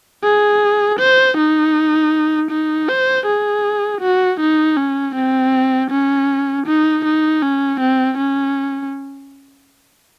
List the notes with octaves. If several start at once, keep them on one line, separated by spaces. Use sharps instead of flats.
G#4
C5
D#4
D#4
C5
G#4
F#4
D#4
C#4
C4
C#4
D#4
D#4
C#4
C4
C#4